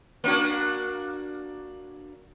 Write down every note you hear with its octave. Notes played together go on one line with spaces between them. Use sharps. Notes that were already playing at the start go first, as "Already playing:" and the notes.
A#3 D4 F#4